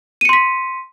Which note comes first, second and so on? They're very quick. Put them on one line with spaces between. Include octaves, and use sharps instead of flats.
D#7 C#7 C6 B6